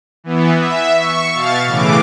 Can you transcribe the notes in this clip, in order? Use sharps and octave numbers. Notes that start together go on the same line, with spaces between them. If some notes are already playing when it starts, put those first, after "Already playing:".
E3 B3
E5
C#6
B2 F5 A6
A2 C#3 E3 D6